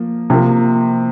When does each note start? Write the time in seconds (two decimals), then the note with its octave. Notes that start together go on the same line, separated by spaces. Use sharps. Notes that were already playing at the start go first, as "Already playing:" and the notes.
Already playing: F3 A#3
0.30 C3 F3 A#3